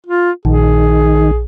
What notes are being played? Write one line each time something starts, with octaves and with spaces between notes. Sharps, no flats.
F4
A#1 D#3 G#4